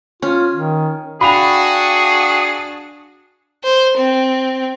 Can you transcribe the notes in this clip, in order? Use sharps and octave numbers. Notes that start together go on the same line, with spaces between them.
C#4 F4
D#3
D4 F#4 G#4 F5 G5 G#5 B5 F7
C5
C4